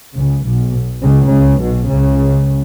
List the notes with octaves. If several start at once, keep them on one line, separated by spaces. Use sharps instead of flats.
C#2 C#3
B1 B2
C#2 C#3
C#2 C#3
B1 B2
C#2 C#3